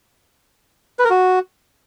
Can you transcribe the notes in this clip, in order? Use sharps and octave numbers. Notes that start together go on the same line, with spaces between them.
B4
A#4
F#4